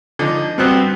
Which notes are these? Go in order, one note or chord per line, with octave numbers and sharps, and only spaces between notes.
D3 F3 D#4
G2 G3 B3 C4 F#4 F#6